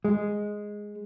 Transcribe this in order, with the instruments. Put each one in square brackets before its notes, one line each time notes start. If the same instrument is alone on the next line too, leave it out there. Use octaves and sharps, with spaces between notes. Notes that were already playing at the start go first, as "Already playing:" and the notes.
[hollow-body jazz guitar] G#3